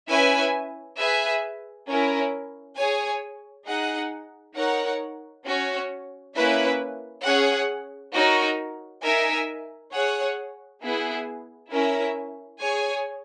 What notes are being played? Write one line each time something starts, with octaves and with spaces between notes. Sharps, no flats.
C#4 E4 B4 E5 G#5
G#4 B4 E5 G#5
C#4 E4 A#4
G#4 C#5 G#5
D#4 G#4 D#5 F#5
D#4 A#4 C#5 F#5
C#4 F#4 C#5
A#3 C#4 E4 B4 E5
C#4 G#4 C#5 F#5
D#4 F#4 A#4 C#5
D#4 A#4 E5 G#5
G#4 C#5 F#5
B3 E4 G#4
C#4 E4 A#4 E5
G#4 C#5 G#5